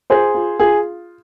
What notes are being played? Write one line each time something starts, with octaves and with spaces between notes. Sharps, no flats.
F4 G#4 C5
F4
F4 G#4